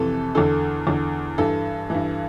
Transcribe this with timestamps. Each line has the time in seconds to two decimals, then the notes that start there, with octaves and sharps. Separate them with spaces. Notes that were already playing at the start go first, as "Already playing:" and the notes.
Already playing: F2 C3 E3 A4
0.35 E2 D3 A4
0.87 E2 D3
1.38 G2 E3 A4
1.90 G2 E3